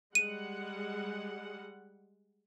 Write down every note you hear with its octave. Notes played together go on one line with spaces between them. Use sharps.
G3 G#3 F#5 D#7